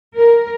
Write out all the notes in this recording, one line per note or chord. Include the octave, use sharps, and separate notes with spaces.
A#4